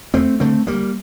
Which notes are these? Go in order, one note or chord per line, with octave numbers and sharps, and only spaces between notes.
E2 A3 C4
D3 A3 C4
D2 G3 A#3